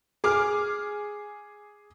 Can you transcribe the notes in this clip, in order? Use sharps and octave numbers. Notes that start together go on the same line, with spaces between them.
G#4 D6 F6